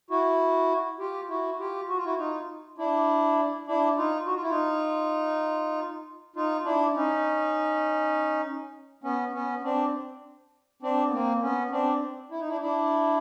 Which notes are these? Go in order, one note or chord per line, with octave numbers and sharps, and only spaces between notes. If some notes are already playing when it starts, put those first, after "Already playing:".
E4 F#4
F4 G4
E4 F#4
F4 G4
F#4
F4
E4 F#4
D#4 F4
D4 E4
D4 E4
D#4 F4
F#4
F4
E4
D#4 F4
D#4 F4
D4 E4
C#4 D#4
B3 C#4
B3 C#4
C4 D4
C4 D4
B3
A#3 C4
B3 C#4
C4 D4
E4
D#4
D4 E4
D4 E4